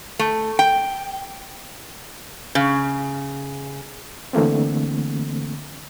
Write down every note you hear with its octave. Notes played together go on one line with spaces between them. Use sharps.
A3
G5
C#3
D3 E3 A3 A#3 C4